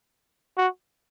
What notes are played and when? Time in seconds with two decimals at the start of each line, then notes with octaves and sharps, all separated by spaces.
0.58 F#4